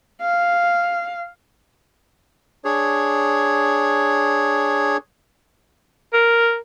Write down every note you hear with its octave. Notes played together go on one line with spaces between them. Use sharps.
F5
D4 G#4 C#5
A#4